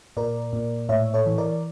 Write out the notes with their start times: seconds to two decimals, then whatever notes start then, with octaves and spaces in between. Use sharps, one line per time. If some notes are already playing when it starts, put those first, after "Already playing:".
0.17 A#2 A#4 D5
0.53 A#2
0.89 A2 C#5 E5
1.14 A4 C#5
1.26 E3
1.38 A#4 D5